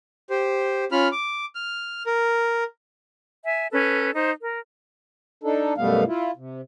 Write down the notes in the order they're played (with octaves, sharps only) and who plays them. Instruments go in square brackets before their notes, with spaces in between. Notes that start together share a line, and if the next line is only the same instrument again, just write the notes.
[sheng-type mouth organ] G4 C5
C#4 F4 B5 F6
D6
F6
A#4
[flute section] E5 G#5
C#4 A4 B4
D#4 C5
A#4
[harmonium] D4 D#4 A4
F#2 B2 G3 A3 B3 F5
E4 F4
C3